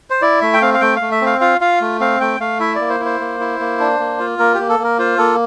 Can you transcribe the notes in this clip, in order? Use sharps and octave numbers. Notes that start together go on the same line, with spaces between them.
C5
E4 D5
A3 E5
G5
C4 F5
F5
A3 G5
F5
A3
E5
C4
F5
F4 F5
F4 F5
A3
C4 F5
A3 G5
A3 F5
E4 E5
A#3 D5
C5
E4
C5
A#3
E4
A#3
D4
A#3
F4
A#3 A#4
A#3 G4
A4
A#3 A#4
F4 C5
A#3 A4